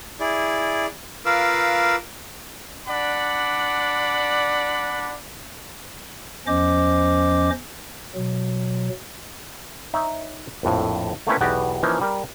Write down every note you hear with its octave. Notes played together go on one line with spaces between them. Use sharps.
E4 G#4 D5
F4 A#4 B4 F5 D6 E6
D4 D5 F#5 B5
E2 F3 C#4 C5 D#5 D6
B2 F#3
D#4 C#5 E5
A#1 F2 A2
A3 A#3 C4 C#4 E4 B4
B1 E2 B3 F#4 G4
E3 F3 A#3 C#4 D#4
G3 A#4